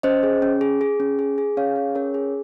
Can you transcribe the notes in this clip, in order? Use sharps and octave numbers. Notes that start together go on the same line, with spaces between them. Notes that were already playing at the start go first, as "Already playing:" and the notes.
C#4 C5 D#5
G#4
C#4
G#4
G#4
C#4
G#4
G#4
C#4 C#5 F5
G#4
C#4 A#4 C#5
G#4